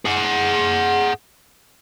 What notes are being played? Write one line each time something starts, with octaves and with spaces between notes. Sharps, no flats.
G#4 F#5